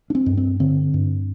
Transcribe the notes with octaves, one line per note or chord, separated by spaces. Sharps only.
D4
C4
G2
C4
D3 C4
G2